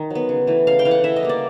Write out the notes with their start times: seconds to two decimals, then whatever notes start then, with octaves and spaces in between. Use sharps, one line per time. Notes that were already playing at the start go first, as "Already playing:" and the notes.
Already playing: D#3
0.10 F#3 B3
0.29 C#3
0.47 E3 A3
0.67 C#3 F5
0.79 G5
0.85 E3 A3 F5
0.91 F#5
1.04 E3 E5
1.16 D#5
1.23 G3 A#3
1.29 D5